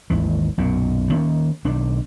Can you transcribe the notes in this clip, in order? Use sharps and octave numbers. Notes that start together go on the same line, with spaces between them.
G#1 D#2 E3
B1 F#2 A#2
D#3 A#3 C#4
B1 D#3 D4